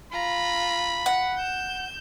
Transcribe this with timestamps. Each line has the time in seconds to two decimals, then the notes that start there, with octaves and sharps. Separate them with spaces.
0.12 F4 A#5 B5
1.06 F#5
1.37 G6 E7